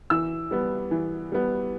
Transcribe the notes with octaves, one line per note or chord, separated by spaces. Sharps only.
E3 E6
G3 B3
E3
G3 B3